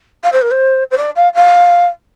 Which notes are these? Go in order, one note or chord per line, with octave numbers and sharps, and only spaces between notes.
F5
C5
A#4
C5
C5
D5
F5
F5